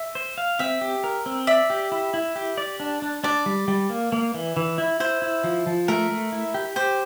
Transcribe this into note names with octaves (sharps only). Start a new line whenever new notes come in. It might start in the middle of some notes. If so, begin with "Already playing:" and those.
Already playing: E5
C5
F5
C4 E5
G4
A#4
C4
D5 E5
G4
E4
E4
G4
D5
D4
D4
D4 D5
G3
G3
A#3
A#3
E3
E3
E4
E4 C5
E4
F3
F3
A3 A#4
A3
E4
G4
G4 C5